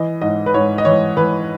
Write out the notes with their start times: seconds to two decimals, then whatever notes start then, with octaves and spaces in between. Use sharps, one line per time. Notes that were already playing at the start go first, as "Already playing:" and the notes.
Already playing: E3 D#5
0.21 G#2 D#5
0.46 B4
0.54 G#2 C#5
0.78 D#5
0.85 E3 C#5
1.17 E3 B4